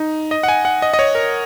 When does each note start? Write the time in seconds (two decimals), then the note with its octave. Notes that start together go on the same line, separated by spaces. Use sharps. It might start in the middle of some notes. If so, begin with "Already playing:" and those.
Already playing: D#4
0.31 D#5
0.43 F#5
0.48 G#5
0.65 F#5
0.82 D#5
0.94 D#5
0.99 C#5
1.15 A#4